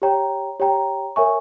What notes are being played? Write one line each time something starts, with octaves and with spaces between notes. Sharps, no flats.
G4 C#5 G5 A#5
G4 C#5 G5 A#5
A#4 C#5 E5 G#5 C#6